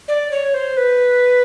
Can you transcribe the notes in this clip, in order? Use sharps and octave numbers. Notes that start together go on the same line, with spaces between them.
D5
C#5
C5
B4